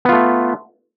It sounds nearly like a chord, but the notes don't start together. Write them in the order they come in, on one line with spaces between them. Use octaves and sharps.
B3 F4 A3